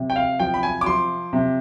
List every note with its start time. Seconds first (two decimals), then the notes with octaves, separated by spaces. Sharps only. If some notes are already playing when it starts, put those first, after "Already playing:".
Already playing: C3 F3
0.10 G5
0.16 F5
0.40 F3 G5
0.54 B5
0.63 G#5
0.81 D6
0.86 F3 C6
1.33 C3